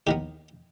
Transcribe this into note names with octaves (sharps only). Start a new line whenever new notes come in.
D#2 D#3 B3 G4